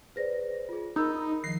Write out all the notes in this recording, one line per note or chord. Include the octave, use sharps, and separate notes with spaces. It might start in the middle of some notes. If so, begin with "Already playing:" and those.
G#4 B4 C5 D5 A#6
F4 G#4
D#4 A#4 D#5 B5 E6 G6
D#3 F3 A#6 C7